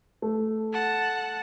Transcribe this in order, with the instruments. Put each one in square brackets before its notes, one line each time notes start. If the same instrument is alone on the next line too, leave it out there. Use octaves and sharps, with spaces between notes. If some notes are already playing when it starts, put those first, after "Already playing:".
[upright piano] A3
[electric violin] F#5 A5